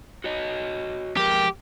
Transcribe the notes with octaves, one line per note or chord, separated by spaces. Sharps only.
F#4 C#5 D#5
F3 G#3 G4 A#4